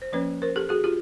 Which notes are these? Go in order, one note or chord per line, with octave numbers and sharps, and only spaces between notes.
C5
F3 A#3 C#4 B4 C#5
A#4 C5
G4 A4
F#4 G#4
F4 G4